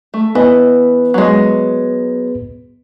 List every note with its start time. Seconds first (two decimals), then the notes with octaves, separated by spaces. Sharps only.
0.14 A3
0.35 E3 B3 B4 D#5
1.14 F#3 G#3